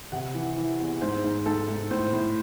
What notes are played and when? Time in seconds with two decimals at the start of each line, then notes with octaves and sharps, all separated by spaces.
0.12 C3 F#5
0.34 E3
0.57 E3
0.80 E2
1.01 G#2 C5
1.24 G#2
1.46 G#2 A4
1.69 G#2
1.91 A2 C5
2.13 A2